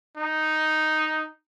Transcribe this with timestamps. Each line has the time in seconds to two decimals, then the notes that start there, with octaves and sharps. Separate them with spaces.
0.17 D#4